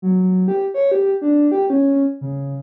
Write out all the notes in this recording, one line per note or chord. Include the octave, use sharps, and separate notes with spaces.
F#3
G4
C#5
G4
D4
G4
C#4
C#3